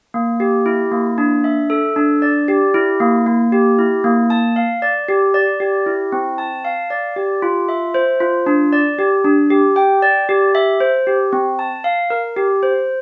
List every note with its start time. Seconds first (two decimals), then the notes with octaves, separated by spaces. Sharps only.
0.14 A#3
0.40 G4
0.66 E4
0.91 A#3
1.18 D4
1.44 E5
1.70 A4
1.96 D4
2.22 D5
2.48 G4
2.74 E4
3.00 A#3
3.26 A#3
3.52 G4
3.78 E4
4.04 A#3
4.30 A5
4.56 F5
4.82 D5
5.08 G4
5.34 D5
5.60 G4
5.86 E4
6.12 C4
6.38 A5
6.65 F5
6.90 D5
7.16 G4
7.42 F4
7.69 E5
7.94 C5
8.20 F4
8.46 D4
8.73 D5
8.99 G4
9.24 D4
9.50 G4
9.76 G5
10.02 D5
10.29 G4
10.55 E5
10.80 C5
11.07 G4
11.33 C4
11.59 A5
11.84 F5
12.10 A#4
12.37 G4
12.63 C5